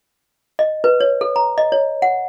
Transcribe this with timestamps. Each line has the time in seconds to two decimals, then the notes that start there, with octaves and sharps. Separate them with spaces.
0.59 D#5
0.84 B4
1.01 C#5
1.21 A4
1.36 A#5
1.58 D#5
1.72 C#5
2.02 F#5